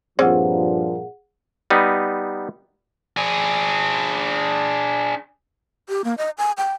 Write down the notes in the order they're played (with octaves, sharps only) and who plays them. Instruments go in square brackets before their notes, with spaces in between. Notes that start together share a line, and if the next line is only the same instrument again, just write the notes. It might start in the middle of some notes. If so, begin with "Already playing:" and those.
[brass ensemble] G2 A#2 F3 [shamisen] C4 C#4 D5 [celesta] G#4 F#5
[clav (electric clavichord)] G3 B3 D#4
[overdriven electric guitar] D4 G#4
[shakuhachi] G4
A#3
D#5
G#5
G5